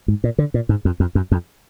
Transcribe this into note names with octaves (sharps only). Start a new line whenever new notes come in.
G#2
A#2
D3
A#2
G#2
F2
F2
F#2
F2